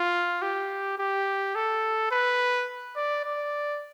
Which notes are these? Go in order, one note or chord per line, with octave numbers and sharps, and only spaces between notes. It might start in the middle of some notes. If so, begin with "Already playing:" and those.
Already playing: F4
G4
G4
A4
B4
D5
D5